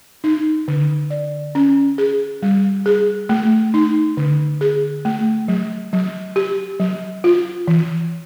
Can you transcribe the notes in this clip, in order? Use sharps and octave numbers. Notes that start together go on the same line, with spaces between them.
D#4
D3
D5
C#4
G#4
G3
G#4
A3
D#4
D3
G#4
A3
F#3
F#3
G4
F#3
F4
E3